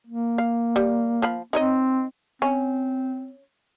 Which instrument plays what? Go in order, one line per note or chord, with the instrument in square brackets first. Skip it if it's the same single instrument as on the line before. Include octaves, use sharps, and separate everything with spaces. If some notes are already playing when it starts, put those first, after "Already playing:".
[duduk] A#3
[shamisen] F5
G3
F3 F5 B5
[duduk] C4 [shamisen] D#4 C#5 D#5
[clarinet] C4 [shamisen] C#4